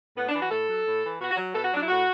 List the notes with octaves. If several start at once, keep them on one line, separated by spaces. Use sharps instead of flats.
A2 B3
D4
E3
F#4
A2 A4
F#3
A2
E3
B2 F#4
F#4
F#3
B2 A4
F#4
F#3 D4
E4
A2 F#4